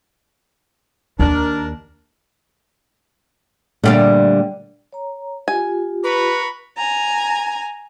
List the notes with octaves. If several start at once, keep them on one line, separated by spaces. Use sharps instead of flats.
D#2 D4 A#4
A#2 D3 G3 A3 D5
C#5 A#5
F4 G4 G#5
B4 A#5 B5 C#6
G#5 A#5